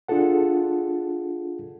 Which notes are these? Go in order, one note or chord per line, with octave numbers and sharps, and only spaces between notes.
D4 F4 G#4 A4 F#5